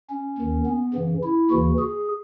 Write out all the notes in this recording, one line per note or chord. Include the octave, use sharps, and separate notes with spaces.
C#4
D#2 D#3
B3
F#2 C#3 E3
E4
D#2 C#3 E3 F#4
G#4